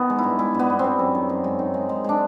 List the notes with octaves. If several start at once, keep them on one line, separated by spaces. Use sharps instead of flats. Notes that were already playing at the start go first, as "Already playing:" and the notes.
Already playing: D#3 B3
G#3
G2 E4
G#3 E4
G2 B3
G2
C4
G2
F#2
D#3
F#2
G#3
D#3
G#3
G#3
G#3 D4